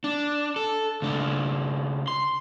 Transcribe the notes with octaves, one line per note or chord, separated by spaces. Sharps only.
D4
A4
C#2 D4
C6